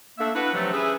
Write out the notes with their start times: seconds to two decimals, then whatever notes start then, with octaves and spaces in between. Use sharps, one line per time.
0.19 A3 A#3 D4 E5
0.35 B3 D4 E4 F#4 B4
0.53 C3 F3 F#3 A3
0.73 E3 C#4 G#4 B4 E5